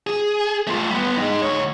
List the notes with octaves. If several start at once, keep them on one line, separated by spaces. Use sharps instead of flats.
G#4
A3 F4
G3 B3
G#3 D#4
D2 C#5